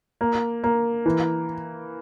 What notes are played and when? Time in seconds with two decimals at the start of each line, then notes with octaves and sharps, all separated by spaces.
0.21 A#3
0.64 A#3
1.06 E3